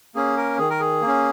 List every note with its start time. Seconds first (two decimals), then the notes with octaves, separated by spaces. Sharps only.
0.15 A#3 C#4 G#4
0.37 A#4
0.59 D#3 G#4
0.70 A#4
0.80 G#4
1.02 A#3
1.07 C#4